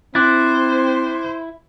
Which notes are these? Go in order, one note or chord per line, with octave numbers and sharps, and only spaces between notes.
C4 E4 C5 D6 F#6 A6